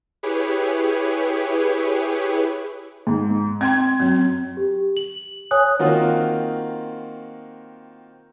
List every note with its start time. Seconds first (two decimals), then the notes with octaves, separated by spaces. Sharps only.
0.23 E4 G4 G#4 B4 C#5
3.07 G#2
3.61 C4 G5 C6 G#6
4.00 F#2 C4
4.57 G4
4.97 F#7
5.51 C#5 G#5 D#6 F#6
5.79 D#3 A#3 C4 F4 F#4